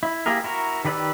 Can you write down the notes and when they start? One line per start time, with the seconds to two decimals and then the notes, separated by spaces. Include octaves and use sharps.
0.03 E4
0.26 A#3 E4 G4 G#4 A#4
0.44 E4 F#4 A#4
0.85 D#3 G4 B4 D5 E6